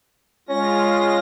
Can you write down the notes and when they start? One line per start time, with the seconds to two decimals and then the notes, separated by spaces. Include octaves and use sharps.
0.49 G#3 C#4 F4 A#6